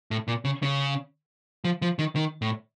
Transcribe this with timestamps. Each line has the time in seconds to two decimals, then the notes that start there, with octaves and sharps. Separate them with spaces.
0.11 A2
0.28 A#2
0.45 C#3
0.63 C#3
1.65 F3
1.82 F3
1.99 D#3
2.16 D#3
2.42 A2